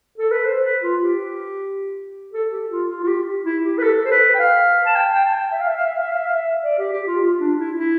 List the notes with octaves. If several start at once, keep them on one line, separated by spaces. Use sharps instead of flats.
A4
B4
C5
B4
F4
G4
A4
G4
F4
F4
F4
G4
E4
G4
B4
A4
C5
B4
G5
F5
A5
G5
G5
A5
G5
E5
F5
E5
F5
E5
F5
E5
F5
E5
F5
E5
D5
G4
G4
F4
F4
D4
E4
E4